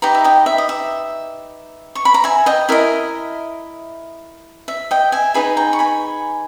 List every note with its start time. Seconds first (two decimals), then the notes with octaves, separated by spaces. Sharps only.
0.02 D#4 G4 B4 G5 A#5
0.15 E5
0.24 D#5 G5
0.46 E5
0.58 D#5
0.69 E5
1.95 C#6
2.05 B5
2.14 A#5
2.24 E5 G#5
2.46 D#5 G5
2.69 E4 A#4 D#5 E5
4.68 E5
4.91 D#5 G5
5.12 E5 G#5
5.34 D#4 G#4 B4 G#5 B5
5.57 G5 A#5
5.73 C#6
5.79 G#5 B5